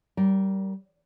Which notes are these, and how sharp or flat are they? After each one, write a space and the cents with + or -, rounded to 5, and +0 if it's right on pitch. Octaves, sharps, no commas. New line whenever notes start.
G3 -20 A#4 +0